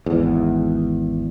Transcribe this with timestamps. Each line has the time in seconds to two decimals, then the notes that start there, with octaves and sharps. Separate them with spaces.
0.06 G#1 E2